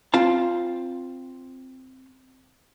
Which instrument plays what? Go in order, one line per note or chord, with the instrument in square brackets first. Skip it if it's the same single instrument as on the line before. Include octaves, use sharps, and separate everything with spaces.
[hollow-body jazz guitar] C4 F4 F5 A5